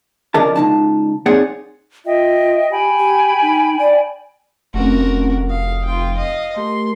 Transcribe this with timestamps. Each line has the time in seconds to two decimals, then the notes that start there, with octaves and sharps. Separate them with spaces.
0.34 F2 C#3 D4 A#4 D#5 A5
0.56 C#2 D#4 A5
1.26 C4 D#4 G#4 C#5 D5 F#5
2.05 F4 D#5 E5 G5
2.71 G4 G5 G#5 B5
2.99 G4
3.42 D#4
3.79 D5
4.74 F1 A3 C4 C#4 F#4 A#4
5.50 F5 D#6
5.85 F4 G5
6.17 D#5 F5
6.56 A3 G4 A#4 C6